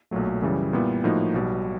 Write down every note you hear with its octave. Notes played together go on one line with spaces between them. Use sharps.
B1 A#2 F#3 A3
F#2 C#3 E3 G3
A#2 G3 B3 E4
A2 F3 A#3 D#4 F#4
B1 B2 G3